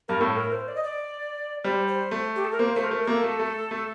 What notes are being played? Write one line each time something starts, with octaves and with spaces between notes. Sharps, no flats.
G2 A#4
A2 A4
A#4
C5
D5
D#5
D5
G3 C5
C5
A3
G4
A4
A#4
A#3 C5
A3 C5
A#4
A3
A#4
A#3 A4
A3
A3
A3